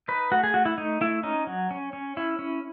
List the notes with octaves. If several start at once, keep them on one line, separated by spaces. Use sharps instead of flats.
D#4 B4
A3 F#4
G#4
A3 F#4
E4
A3 D#4
A3 E4
C#4 D#4
F#3
C#4
C#4
C#4 E4
C#4